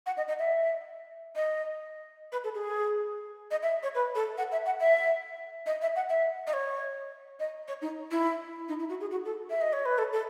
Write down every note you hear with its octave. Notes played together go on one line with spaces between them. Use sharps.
F#5
D#5
D#5
E5
D#5
B4
A4
G#4
D#5
E5
C#5
B4
A4
F#5
E5
F#5
E5
D#5
E5
F#5
E5
D#5
C#5
D#5
C#5
D#4
E4
D#4
E4
F#4
G#4
F#4
A4
E5
D#5
C#5
B4
A4
A4